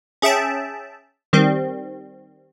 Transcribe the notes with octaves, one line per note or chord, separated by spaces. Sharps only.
C#4 G#4 E5 G5 A5
D#3 G3 C4